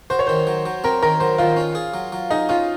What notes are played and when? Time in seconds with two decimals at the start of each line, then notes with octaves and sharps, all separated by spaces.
0.10 F#4 C5
0.19 C#5
0.27 D#3 C5
0.47 F#3
0.66 F#3
0.84 C4 A#4
1.03 D#3 A#4
1.20 F#3 C5
1.38 D#3 F4
1.57 C#4
1.75 G#4
1.94 F#3
2.12 F#3
2.30 D#4 G#4
2.49 C#4 F4